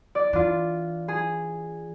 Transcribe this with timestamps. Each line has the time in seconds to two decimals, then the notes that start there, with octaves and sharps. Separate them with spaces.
0.15 D5
0.33 E3 D4 F4
1.08 G#4